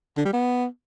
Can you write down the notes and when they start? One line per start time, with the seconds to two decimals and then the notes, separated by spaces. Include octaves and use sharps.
0.17 D3
0.25 G3
0.33 B3